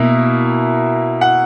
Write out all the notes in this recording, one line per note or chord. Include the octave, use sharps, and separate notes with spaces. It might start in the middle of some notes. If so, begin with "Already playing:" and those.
Already playing: B2 A#3 E4
F#5